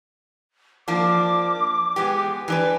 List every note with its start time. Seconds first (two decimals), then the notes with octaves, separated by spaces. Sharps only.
0.88 F3 A#3 D4 D6
1.96 G#3 B3 G4
2.48 E3 D4 B4